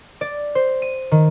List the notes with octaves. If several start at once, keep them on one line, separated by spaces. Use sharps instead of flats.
D5
C5
D#7
D#3